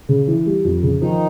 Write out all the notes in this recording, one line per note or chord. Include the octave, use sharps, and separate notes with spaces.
C#3
E3
G3
F2
C#3
D#3 F3 D#4